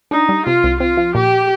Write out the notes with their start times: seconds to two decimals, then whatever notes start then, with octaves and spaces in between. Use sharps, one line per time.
0.11 D4 D#4
0.29 G3
0.47 C3 F4
0.64 C2
0.80 C4 F4
0.97 F3
1.15 A#2 G4